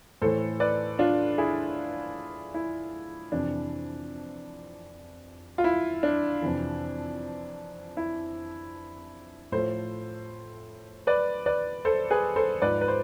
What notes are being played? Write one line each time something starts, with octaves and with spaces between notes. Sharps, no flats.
A2 E3 A4 C5
B4 D5
D4 F4
E4 G#4
E4
F2 C3 E3 D4
F4
E4
D4
F2 C3 E3
E4
A2 F3 A4 C5
B4 D5
B4 D5
A4 C5
G#4 B4
A4 C5
G#2 F3 B4 D5
B4
C5